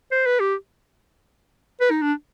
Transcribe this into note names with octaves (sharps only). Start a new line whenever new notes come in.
C5
B4
G4
B4
D#4
D4